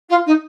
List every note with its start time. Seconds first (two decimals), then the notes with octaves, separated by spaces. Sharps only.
0.09 F4
0.26 D#4